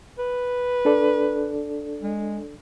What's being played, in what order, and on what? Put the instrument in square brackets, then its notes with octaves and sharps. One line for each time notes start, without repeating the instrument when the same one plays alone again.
[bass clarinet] B4
[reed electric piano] D4 A4 D5
[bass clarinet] G#3